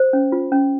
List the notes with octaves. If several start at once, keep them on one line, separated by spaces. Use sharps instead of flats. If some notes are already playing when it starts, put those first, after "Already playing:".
Already playing: C5
C#4
F4
C#4